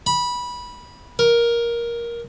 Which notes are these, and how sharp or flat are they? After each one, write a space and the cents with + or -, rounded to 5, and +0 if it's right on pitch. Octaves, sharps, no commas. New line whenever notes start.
B5 -15
A#4 +10